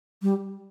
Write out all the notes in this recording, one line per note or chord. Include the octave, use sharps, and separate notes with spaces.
G3